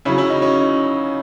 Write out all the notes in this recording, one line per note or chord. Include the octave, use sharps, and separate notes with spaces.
C#3 F#3 C#4 E4
C#4 E4
D#4
C#4